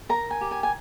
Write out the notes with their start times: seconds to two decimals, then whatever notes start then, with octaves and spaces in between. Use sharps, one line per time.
0.09 A#4 A#5
0.31 G#5
0.41 G4
0.51 G#5
0.63 G#5